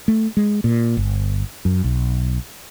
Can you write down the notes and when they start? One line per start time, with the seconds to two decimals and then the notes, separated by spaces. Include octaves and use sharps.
0.08 A3
0.37 G#3
0.64 A#2
0.97 G1
1.65 F#2
1.84 B1